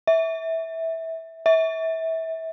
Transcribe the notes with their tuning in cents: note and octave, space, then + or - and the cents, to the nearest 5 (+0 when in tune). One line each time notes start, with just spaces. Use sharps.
E5 -15
E5 -25